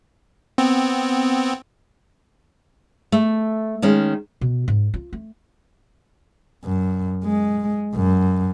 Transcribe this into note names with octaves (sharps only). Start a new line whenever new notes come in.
B3 C4
A3
D#3 G#3 C#4
B2
G#2
F4
A3
F#2
G#3
F#2